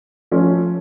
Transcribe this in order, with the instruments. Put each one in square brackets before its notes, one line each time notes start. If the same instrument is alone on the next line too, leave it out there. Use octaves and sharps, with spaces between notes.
[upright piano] F3 A3 C#4